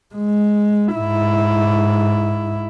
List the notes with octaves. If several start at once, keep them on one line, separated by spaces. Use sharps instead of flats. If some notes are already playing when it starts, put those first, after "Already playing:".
G#3
G#2 E4